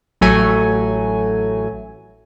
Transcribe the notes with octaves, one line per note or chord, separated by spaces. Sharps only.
A1 F#3 A3 G#5